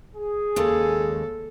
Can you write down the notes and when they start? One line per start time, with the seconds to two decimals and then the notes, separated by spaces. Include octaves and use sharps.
0.16 G#4
0.56 D#2 C#3 G#3 A4